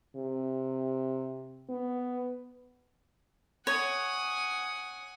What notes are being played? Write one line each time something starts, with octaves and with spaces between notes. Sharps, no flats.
C3
B3
C#5 F#5 G#5 D#6